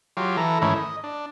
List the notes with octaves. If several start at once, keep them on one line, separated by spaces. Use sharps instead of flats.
F#3 F4 G4
E3 A4 A#5
G#2 D#3 E3 A3 C#4 E4
D#5
D4